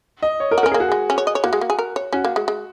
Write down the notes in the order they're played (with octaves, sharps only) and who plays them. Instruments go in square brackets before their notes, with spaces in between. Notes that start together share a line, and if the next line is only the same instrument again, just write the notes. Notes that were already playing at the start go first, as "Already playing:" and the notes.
[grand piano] D#5
C#5
A#4
[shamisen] F#4
[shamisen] C#4 [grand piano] A#4
[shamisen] A#3 [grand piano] G#4
[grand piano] F#4
[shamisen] G#3 [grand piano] G#4
[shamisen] C#4
C#5
D#5
C#5
[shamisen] A#3 [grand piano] F#4
[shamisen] G#3
A#3
G#4
A#4
C#5
[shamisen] C#4 [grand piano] F#4
[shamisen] A#3
G#3
G#3